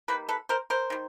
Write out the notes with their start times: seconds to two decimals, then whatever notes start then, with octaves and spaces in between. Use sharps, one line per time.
0.08 D#3 G3 A#3 B4
0.29 A4 B4
0.49 A#4 C5
0.70 A#4 C5
0.90 D#3 G3